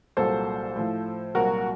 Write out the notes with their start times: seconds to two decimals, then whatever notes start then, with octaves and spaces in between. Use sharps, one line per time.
0.17 C2 A#2 F#3 A4 C5
0.76 A2 F3
1.35 C2 A#2 F#3 F#4 A#4